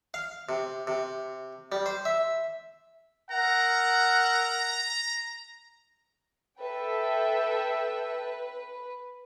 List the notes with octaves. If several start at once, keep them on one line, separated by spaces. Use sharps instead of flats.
F5
C3
C3
G3
C5
E5
A#4 E5 F#5 A#5
A4 B4 E5 G5